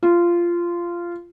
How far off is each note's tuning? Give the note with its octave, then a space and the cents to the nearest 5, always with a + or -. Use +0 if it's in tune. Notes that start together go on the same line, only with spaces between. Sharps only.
F4 -15